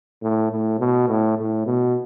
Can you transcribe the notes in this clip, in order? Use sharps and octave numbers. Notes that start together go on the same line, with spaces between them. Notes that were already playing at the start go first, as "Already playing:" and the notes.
A2
A2
B2
A2
A2
B2